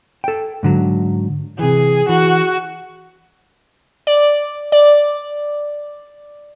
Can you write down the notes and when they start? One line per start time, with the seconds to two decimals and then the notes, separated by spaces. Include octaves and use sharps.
0.24 A4 G5
0.63 G#2 D3 F#3
1.59 C3 E3 G#4
2.09 E3 F#4
4.07 D5
4.72 D5